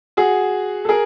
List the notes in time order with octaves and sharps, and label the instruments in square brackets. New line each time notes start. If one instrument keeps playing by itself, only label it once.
[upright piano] F#4 G#4
A4
G#4 A#4